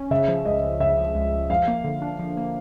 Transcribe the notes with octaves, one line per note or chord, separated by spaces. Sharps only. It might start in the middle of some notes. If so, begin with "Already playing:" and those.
Already playing: C#4
C#3 E5
F3
C#2 D#5
C#2
C#3 E5
F3
C#2
C#2
F3 F5
A#3
D3
D4
F3
A#3